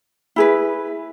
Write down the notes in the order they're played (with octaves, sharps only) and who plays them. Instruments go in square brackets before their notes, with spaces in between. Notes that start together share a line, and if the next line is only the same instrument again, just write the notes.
[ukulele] E4 G#4 B4